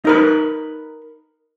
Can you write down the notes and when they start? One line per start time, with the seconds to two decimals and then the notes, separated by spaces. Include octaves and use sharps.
0.05 D#4 A#4 B4